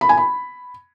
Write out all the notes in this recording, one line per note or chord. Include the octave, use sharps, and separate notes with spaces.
B5
G#5
B5